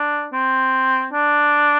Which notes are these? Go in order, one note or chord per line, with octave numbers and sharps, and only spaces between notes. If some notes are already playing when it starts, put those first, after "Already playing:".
Already playing: D4
C4
D4